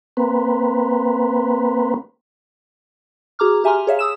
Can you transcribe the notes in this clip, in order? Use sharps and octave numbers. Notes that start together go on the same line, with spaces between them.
A#3 C4 B4
F#4 G#4 A#5 D6 F6
G4 E5 G#5 A#5 C6 F6
G#4 C#5 E5 F5
D#6 E6 E7